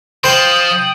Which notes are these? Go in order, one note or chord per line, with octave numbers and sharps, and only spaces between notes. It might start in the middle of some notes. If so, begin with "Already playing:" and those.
F3 C5 G5 D#6 F#7